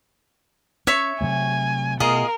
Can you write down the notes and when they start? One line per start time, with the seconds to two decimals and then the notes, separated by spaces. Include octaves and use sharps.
0.87 C#4 C#5 E5 C#6
1.21 C3 F#3 A3 G#5
2.00 B2 A3 F4 G#4 A#4 D#5